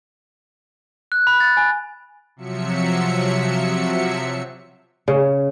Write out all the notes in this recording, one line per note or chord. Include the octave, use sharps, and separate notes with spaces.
F#6
B5
A6
G#5
C3 F3 F#3 E5 C#7
C#3